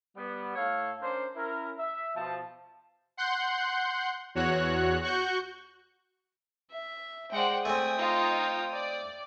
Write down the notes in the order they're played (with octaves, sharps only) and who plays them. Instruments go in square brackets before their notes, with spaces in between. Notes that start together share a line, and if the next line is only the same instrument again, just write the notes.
[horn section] G3 B3
A2 A4 C#5 F5
C#4 D4 A#4 C5
C#4 E4 A#4
E5
B2 F3 A5
[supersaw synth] F#5 C6 F#6 G6
E2 F#4 C#5 F#6
F#4 C#6 F#6 G6
[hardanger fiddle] E5
[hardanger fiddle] G#3 D5 [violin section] C5 F#5 G5
[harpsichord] A3 C4 [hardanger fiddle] G5 D#6 [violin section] G#5
[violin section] D#4 F4
D5